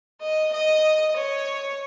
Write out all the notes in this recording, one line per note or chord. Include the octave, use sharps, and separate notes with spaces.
D#5
D#5
C#5